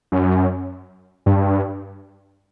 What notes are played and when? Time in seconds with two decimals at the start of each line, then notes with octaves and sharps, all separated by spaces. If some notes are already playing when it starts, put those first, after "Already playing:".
0.12 F#2
1.26 G2